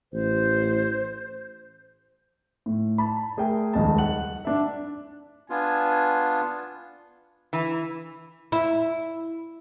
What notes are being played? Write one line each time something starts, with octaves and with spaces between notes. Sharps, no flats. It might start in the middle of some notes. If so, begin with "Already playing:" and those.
A1 C5
A2
A5 B5
A3 G#4 A#4 G5 G#5
D#1 C#2 A5
F#5 F#7
D4 E5
B3 D4 F4 G#5
E3
E4